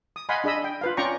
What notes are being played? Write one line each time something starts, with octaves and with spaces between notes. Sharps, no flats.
D#6
D#5 F5 F#5 G#5 B5 C6
D4 G#4 D#5 B5 E6
G5
F4 B4 F5
C#4 F4 D5 G5 A#5 C#6